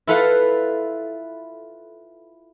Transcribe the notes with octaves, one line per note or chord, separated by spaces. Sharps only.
E4 F4 A4 B4 F5 F#5